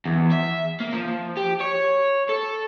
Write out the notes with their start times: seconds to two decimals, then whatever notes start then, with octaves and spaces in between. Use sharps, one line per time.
0.05 E2
0.31 E5
0.80 A#3
0.94 F3
1.37 G4
1.60 C#5
2.29 A4